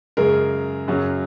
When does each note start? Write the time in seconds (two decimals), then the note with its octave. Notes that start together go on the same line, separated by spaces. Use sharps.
0.17 F#2 C#3 G#3 A#4
0.88 F#2 C#3 F#3